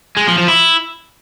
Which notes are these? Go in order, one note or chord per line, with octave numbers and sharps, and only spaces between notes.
G#3
F3
F3
E4